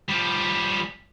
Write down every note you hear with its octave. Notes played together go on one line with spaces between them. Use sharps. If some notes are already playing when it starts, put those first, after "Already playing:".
F3 G3